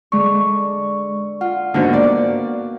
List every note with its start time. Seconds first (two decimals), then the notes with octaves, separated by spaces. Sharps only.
0.12 D3 G#3 C#6
1.41 F4 F#5
1.74 G#2 D3 A#3 B3 F#4
1.93 D5